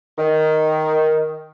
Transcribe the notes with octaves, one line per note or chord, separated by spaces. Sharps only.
D#3